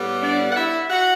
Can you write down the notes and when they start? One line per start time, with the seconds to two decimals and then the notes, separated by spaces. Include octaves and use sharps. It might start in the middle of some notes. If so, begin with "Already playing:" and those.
Already playing: A2 G3 B3
0.21 D4 D5
0.51 F#5
0.56 E4 E5
0.90 F#4 F#5